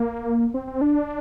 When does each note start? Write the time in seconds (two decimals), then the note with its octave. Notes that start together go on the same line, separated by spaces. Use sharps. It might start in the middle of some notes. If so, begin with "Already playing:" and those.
Already playing: A#3
0.54 C4
0.67 C4
0.81 D4